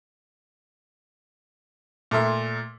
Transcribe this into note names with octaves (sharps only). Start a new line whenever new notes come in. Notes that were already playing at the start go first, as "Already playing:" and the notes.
A#2 A3 A#4 E5 C6